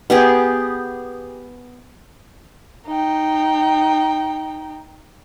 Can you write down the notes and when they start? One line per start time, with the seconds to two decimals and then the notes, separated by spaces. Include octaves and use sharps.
0.10 B3 G4 G#4
2.87 D#4 G5